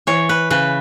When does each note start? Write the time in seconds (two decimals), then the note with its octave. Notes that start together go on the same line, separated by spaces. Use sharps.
0.07 E3 C#5
0.29 B4
0.50 C#3 B4